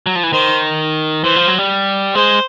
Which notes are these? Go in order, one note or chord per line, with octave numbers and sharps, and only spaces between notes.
F#3
F3
E3
D#3 C5
E3 C5
F3
F#3
G3
G#3 C5